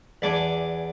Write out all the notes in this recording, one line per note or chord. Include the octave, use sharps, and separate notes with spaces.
E2 D4 G#5 D6